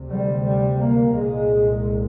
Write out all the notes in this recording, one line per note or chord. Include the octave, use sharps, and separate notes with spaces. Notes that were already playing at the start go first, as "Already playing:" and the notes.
Already playing: D2 C3
G3
G3
A#3
C2 A#2 G#3